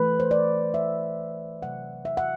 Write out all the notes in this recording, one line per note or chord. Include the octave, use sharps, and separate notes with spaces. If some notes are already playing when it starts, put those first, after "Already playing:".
Already playing: E3 A3 B4
C5
D5
E5
C3 F#3 A3 F#5
E5
F#5